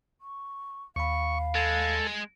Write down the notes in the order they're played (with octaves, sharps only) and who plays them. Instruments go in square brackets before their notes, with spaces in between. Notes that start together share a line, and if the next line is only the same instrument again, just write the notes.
[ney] C#6
[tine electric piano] D#2 B5 [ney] F5 [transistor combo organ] C#6
[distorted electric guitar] G#3 [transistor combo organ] A4